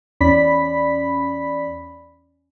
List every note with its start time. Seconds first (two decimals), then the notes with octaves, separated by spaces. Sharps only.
0.20 E2 C#4 D5 B5 B6